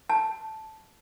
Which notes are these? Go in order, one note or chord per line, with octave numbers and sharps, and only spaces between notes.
A5